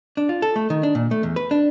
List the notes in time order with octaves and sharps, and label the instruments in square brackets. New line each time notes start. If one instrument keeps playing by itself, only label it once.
[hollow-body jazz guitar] D4
F4
A4
A3
D#3
D4
A#2
A3
E2
B4
D4